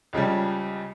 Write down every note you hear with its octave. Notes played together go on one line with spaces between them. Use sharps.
C#2 C#3 F3 G3